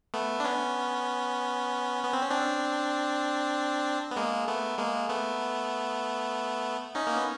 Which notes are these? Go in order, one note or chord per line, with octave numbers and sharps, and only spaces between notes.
A3 B3
D4
B3 C#4
B3
C4
C#4
C4 D4
B3
G#3 A#3
A3 B3
G#3 A#3
A3 B3
C#4 D#4
A#3
B3